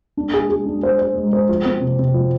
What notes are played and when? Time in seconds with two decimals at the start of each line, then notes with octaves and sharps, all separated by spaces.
0.17 D4
0.34 G#4
0.49 G#4
0.66 D4
0.83 C5
0.99 C5
1.16 G#3
1.33 C5
1.49 F3
1.65 C4
1.81 C3
1.99 C3
2.14 F3